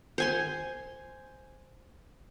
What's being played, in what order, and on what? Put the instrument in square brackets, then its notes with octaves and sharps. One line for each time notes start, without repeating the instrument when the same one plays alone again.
[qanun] C5 G#5 C6